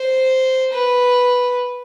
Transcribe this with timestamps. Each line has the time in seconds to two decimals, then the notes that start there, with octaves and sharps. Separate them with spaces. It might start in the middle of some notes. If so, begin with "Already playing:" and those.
Already playing: C5
0.73 B4